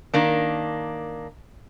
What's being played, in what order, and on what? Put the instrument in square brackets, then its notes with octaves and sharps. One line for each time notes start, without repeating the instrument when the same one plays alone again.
[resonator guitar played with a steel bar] D#3 A#3 D4